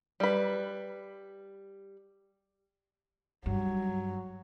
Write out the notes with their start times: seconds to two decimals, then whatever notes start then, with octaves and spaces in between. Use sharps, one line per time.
0.20 G3 B4
3.46 G2 F#3